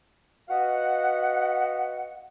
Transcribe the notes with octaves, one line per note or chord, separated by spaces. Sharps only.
F#4 B4 D#5 F5 F#5